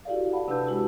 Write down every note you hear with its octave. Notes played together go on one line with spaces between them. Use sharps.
E4 F#4 G4 A4 D5 F5
F5 F#5 A5 B5
C3 D4 B4 A5 E6 G6
G#3 E4 F#4 G4